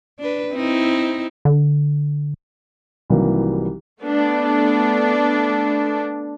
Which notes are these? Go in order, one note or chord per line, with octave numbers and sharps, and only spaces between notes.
D4 B4
C4 D#4 E4
D3
C2 C3 D#3 E3 F#3 A#3
A3 B3 D4